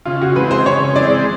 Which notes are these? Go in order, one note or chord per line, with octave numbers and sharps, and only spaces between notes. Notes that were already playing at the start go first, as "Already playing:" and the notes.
C#3 F4
F#4
E3 G#3 C4 B4
C5
C#3 C#5
E3 G#3 C4 D5